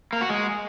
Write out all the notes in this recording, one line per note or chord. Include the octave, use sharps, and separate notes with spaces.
A#3
F#4
G#3